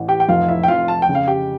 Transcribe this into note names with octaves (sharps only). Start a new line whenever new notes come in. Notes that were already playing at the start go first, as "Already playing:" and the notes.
Already playing: A1 E3
G4 G5
G5
F1 F4 F5
E4 E5
G5
F2 F4 F5
A5
G5
C#3
F5
G4 G5